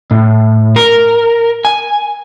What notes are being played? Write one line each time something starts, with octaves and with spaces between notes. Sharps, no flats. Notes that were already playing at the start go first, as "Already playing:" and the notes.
A2
A#4
G#5